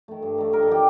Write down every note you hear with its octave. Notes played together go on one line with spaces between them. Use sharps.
D#3 A3
G2
D#3 A3
G2 A#4
A4
D#3 G3 G4